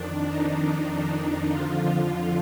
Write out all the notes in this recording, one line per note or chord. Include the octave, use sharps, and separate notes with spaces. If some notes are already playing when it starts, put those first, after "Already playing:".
Already playing: F2 D#3 D4
D#4
F2 D3 F3 F4